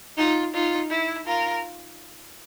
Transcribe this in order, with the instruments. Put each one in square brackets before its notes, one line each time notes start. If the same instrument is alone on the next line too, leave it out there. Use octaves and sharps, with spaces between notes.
[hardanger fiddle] D#4 [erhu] F4
[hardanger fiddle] D#4 [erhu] F4
[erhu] E4
[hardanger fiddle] F4 [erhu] A#4